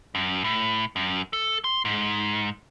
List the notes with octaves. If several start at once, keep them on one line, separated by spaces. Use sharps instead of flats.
F#2
A2
F#2
A4
C6
G#2